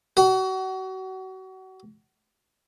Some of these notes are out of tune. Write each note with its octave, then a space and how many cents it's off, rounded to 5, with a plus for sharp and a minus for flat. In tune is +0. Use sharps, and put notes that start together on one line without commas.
F#4 +30